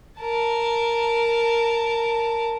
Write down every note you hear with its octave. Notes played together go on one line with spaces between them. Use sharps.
A#4 A5